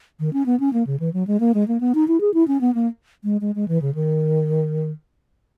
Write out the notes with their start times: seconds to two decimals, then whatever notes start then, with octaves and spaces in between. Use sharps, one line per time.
0.20 D#3
0.33 C#4
0.46 B3
0.60 C#4
0.73 A#3
0.87 C#3
1.00 E3
1.14 F#3
1.27 G#3
1.40 A#3
1.54 G#3
1.68 A#3
1.80 B3
1.95 D#4
2.08 E4
2.21 G#4
2.34 E4
2.48 C#4
2.61 B3
2.75 A#3
3.24 G#3
3.41 G#3
3.55 G#3
3.68 E3
3.82 C#3
3.95 D#3